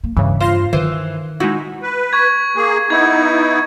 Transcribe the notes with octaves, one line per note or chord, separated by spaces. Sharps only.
A#3
G2 C#3 E3
F4 C5 A#6 C7
D#3 E3 C5
G#3 D#4 E4 F#4
B4
C#6 G#6
A#3 G#4
B3 D#4 E4 G#6